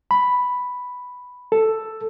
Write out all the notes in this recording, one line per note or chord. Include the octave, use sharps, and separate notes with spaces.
B5
A4